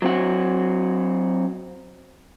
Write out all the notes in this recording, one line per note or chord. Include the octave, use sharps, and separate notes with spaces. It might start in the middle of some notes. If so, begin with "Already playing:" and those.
F#3 C4 F#4